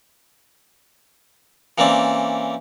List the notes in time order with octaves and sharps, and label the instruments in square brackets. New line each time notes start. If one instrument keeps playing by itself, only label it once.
[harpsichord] E3 A#3 C4 C#4 D5